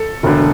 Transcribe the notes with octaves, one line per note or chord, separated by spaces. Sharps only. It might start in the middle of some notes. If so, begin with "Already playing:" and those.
Already playing: A4
E1 D2 D3